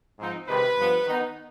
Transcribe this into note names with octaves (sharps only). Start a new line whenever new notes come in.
G#2 F3 C4 D#4
C3 D#3 G#3 B4
G2 F3 B3
D#3 B3 D#4